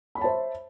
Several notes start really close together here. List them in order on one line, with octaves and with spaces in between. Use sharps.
B5 C#5 A5 C5 E5